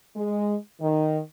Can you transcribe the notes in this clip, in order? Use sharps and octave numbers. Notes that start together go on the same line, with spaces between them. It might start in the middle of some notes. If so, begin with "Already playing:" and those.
G#3
D#3